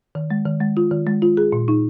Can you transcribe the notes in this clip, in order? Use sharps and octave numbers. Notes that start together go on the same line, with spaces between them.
D#3
G#3
D#3
G#3
F4
D#3
G#3
F4
G#4
A#2
D#4